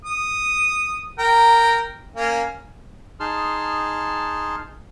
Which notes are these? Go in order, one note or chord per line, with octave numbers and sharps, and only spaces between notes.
D#6
A#4 G5
A#3 C#4
D#4 G#4 A5 C6 F6